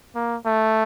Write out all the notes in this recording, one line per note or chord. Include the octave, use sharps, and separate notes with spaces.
A#3
A3